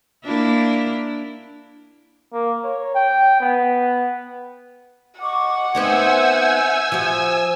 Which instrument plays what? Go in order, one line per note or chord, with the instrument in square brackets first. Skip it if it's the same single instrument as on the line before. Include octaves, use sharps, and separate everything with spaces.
[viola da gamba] A#3 D4 E4
[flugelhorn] A#3
C#5
G5
B3
[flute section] D#5 C#6 D6 [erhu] F#5
[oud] B3 C4 D#4 [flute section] E5 G6 G#6 [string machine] G#5 E6
[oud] F3 F#4